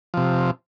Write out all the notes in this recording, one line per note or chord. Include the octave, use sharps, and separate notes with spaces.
C3 F3